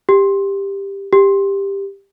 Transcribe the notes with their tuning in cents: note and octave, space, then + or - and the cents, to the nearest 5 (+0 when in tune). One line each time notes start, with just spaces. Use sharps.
G4 +10
G4 +10